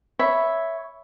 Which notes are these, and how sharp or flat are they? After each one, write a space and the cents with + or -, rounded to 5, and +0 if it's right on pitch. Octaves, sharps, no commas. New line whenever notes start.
C#5 +0 E5 +0 B5 +0